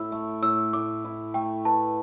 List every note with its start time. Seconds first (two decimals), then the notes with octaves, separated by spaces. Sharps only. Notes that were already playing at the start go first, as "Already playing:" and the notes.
Already playing: A2 E4 E6
0.12 A3
0.42 A2 E6
0.73 A2 D6
1.05 E4
1.34 A3 G5
1.65 B4 A5